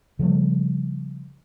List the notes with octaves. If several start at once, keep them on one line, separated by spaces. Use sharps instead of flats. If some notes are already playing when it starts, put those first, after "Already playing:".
C#3 F3 G3 A3